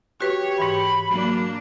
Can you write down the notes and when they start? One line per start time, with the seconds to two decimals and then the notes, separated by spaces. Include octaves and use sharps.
0.21 F#4 G4 B4 C#5
0.59 G#2 E3 B5
1.10 F#3 A#3 D4